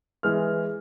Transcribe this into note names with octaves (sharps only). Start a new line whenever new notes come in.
E3 G#3 F6